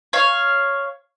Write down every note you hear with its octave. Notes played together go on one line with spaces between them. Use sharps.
C#5 F5